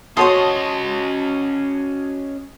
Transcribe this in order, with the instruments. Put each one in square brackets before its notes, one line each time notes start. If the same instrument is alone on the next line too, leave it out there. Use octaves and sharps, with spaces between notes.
[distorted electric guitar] C#4 D#5 [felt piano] F#4 A5 D#6 [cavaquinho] C5 C#5 C6